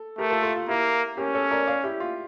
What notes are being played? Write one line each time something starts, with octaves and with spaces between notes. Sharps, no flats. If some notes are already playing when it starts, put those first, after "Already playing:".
Already playing: A4
A3 G4 A#4
F4 A4
F4 A4
F4
A#3 E4 G4
C#4 G4 A#4
A4 C#5
A#4 D5
D5 F5
E4 G4
F4